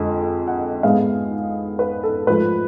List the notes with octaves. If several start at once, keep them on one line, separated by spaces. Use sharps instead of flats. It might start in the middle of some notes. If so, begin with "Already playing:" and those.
Already playing: F2 D3 G#3
F#5
G#2 G#3 B3 F5
B4
A4
G#2 F3 A3 B4